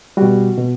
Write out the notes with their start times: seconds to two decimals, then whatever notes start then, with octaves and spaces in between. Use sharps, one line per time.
0.17 B2 G3 F#4
0.58 B2